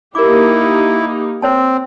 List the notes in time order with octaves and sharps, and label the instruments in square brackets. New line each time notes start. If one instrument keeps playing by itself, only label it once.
[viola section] A#3 D#4 G4 [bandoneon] E4 [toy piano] A#4 D6
[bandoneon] C4 [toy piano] C5 C#5 A5